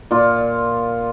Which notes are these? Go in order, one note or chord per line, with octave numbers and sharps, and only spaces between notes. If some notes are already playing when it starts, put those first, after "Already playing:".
A#2 F4